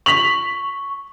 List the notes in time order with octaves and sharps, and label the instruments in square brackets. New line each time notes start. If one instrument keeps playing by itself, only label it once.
[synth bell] C#6 [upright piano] B6 F7 F#7